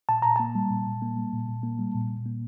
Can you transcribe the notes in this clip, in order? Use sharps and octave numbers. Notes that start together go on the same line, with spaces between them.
A#2 A5
A#2 A#5
A#3 A5
G3
A#2
A#2
A#3
G3
A#2
A#2
A#3
G3
A#2
A#2
A#3